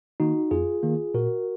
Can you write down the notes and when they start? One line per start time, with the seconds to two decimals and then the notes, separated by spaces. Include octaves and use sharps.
0.20 D#3 A#3 D#4 F#4
0.51 F2 F4 G#4
0.83 D#3 A#3
1.14 A#2 F#4 A#4